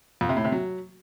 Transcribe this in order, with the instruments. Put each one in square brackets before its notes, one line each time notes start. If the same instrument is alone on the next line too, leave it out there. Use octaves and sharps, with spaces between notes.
[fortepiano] F2
C3
A2
C3
F#3